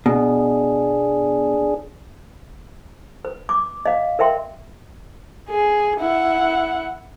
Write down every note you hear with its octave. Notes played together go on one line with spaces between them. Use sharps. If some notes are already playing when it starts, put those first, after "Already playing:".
B2 D4 G#4
B4
D6
D#5 F5
A#4 B4 E5 G5 C6
G#4
E4 F#5